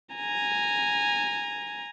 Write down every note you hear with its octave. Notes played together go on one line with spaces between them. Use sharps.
G#5 A#5